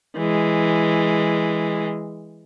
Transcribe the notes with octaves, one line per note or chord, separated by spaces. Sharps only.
E3 G#3